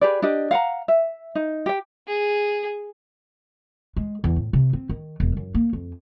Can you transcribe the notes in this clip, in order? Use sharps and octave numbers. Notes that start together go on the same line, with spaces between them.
G4 G#4 B4 D5
D4 G4 D#5
F5 F#5 G#5 A#5
E5
D#4
G4 G5
G#4
G#3
E2
A2
C3
C4
D#3
E1
F#2
A#3
F2